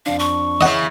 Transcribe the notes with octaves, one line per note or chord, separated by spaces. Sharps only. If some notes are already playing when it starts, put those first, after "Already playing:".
F2 D4 F5
C#6
C#3 E3 D#5 F#5